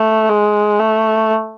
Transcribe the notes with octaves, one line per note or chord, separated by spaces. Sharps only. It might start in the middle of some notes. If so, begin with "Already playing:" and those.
Already playing: A3
G#3
A3